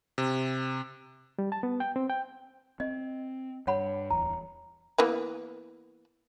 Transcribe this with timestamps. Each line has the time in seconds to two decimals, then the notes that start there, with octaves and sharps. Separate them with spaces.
0.18 C3
1.39 G3
1.52 A5
1.63 B3
1.80 G5
1.96 C4
2.10 G5
2.80 C4 D#5
3.67 G2 C#5 F#5 B5
4.11 D1 E2 A#5
4.98 E3 A#3 B3